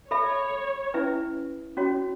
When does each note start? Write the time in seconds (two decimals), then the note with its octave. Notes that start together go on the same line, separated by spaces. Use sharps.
0.11 A4 C#5 E5 B5
0.94 C#4 E4 B4 E5 G#5
1.77 C#4 F#4 C#5